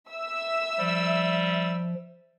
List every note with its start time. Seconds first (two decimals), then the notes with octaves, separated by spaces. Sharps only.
0.11 E5 E6
0.79 F3 G3